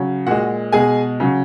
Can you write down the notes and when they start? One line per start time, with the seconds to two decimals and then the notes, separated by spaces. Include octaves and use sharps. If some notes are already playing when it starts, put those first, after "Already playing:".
Already playing: C#3 F#3
0.27 A#2 G#3 F#4 F#5
0.72 B2 G#3 G#4 G#5
1.20 C#3 F#3